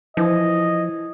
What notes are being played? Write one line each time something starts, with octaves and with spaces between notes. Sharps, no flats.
E3 F3 D#5